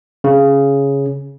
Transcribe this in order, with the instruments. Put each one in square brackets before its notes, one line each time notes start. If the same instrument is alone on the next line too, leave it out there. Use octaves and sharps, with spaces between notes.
[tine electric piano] C#3